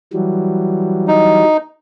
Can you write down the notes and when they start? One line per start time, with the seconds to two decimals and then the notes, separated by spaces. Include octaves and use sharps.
0.13 E3 F#3 G3
1.08 D#4